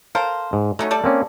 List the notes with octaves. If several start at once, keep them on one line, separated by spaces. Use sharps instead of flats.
A4 A#4 C5 F5
G#2
F#3 A3 C#4 D#4
G3 A4 D5
A#3 C4 C#4